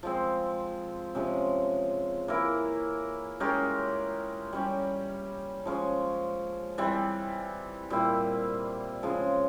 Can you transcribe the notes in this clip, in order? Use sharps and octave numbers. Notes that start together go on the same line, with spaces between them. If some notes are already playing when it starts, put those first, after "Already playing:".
F3 G#3 C4
C3 F3 G#3 C#4
E3 A#3 E4 A#4
G#3 C#4 G4 A#4
G3 C#4 G4
F3 G#3 C#4
E3 G3 C4
A#2 G3 C4 E4
C#3 F3 G#3